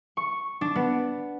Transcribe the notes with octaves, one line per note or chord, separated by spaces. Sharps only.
C#6
D4
B3